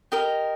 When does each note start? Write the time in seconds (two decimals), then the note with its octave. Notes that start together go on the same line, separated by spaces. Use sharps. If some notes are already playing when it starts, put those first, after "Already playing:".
0.12 G4 A#4 D#5